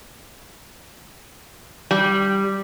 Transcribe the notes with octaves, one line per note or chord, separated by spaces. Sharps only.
G3